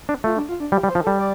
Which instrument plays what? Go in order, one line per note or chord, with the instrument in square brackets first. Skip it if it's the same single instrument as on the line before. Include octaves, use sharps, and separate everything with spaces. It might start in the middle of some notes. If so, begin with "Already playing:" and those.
[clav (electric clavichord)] D4
[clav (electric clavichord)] A3 [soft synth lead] F4
[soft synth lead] D4
F4
D4
[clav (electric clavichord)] G3 [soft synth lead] G4
[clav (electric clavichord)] G3
[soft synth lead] C5
[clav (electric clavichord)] F3
[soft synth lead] A4
[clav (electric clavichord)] G3
[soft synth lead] D5